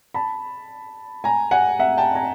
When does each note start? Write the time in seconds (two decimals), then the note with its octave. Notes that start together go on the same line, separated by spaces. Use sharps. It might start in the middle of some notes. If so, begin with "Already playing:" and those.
0.14 A5 B5
1.24 G#5 A#5
1.51 F#5 G#5
1.79 E5 F#5
1.97 G5 A5
2.15 G#5 A#5